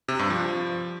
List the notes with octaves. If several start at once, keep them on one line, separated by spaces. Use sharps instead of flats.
C3
G2
F3